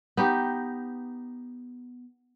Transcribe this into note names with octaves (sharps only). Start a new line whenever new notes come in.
B3 D#4 G4